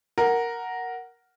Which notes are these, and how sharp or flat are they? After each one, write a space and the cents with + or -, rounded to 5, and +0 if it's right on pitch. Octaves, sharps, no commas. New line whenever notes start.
A#4 +0 F#5 +0